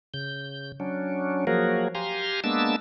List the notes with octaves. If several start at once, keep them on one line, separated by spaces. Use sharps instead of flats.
C#3 G6
F#3 C#4 D4
F3 F#3 A#3 F#4 G#4 A#4
G4 F5 G#5 A#5 C6
G#3 A#3 B3 D4 A5 E6